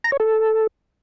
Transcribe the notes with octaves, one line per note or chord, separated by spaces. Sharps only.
A#5
C#5
A4